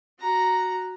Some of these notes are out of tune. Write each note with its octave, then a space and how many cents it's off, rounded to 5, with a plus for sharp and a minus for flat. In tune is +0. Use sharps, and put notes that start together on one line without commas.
F#4 +0 A#5 +0